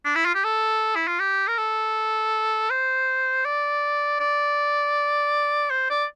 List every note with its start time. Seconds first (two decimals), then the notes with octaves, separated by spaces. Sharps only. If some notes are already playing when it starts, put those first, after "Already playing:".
0.05 D4
0.15 E4
0.25 F4
0.35 G4
0.44 A4
0.96 E4
1.08 F4
1.20 G4
1.48 A#4
1.58 A4
2.70 C5
3.45 D5
4.20 D5
5.70 C5
5.90 D5